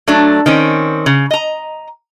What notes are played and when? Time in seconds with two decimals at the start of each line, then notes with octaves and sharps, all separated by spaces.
0.08 F#3 A3 D4
0.46 D#3 C4 C#4
1.06 C#3
1.31 D#5 A#5